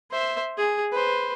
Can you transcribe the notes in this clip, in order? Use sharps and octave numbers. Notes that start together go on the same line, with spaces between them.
C5 E5
G#4
B4 C5